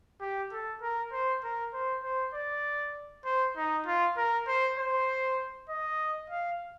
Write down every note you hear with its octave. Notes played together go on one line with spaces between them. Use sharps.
G4
A4
A#4
C5
A#4
C5
C5
D5
C5
D#4
F4
A#4
C5
C5
D#5
F5